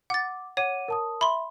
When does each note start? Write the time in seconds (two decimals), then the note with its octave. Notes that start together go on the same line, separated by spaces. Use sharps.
0.10 F#5 D6 A6
0.57 C#5 F#5 D6 D#7
0.88 A#4 A5 D#6
1.21 E5 B5 C6